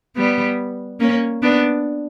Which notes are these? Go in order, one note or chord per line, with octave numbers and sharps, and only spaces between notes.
G3 B3
A#3 C#4
B3 D4